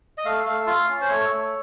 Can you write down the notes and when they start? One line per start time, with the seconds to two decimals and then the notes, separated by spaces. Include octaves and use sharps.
0.18 D#5
0.25 A3 F5
0.45 A3 F5
0.67 F4 F5
0.88 C#4
1.01 C5
1.08 A3 C#5
1.30 A3